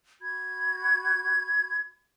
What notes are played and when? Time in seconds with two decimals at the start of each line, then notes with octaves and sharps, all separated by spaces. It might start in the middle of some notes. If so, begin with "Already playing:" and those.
0.22 F#4 B5 G#6